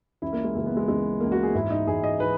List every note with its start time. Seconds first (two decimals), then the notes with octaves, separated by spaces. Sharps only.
0.22 C#2 C#3 E3 E4
0.33 A#3
0.44 G#3
0.55 C#2 C#3 E3 A#3
0.66 B3
0.77 G#3
0.88 C#2 C#3 E3 G#3
1.20 C#2 C#3 E3 A#3
1.32 F#4
1.43 G#4
1.54 G#2 E3 E4
1.70 D#4
1.87 G#2 E3 G#4
2.04 D#5
2.20 E3 B4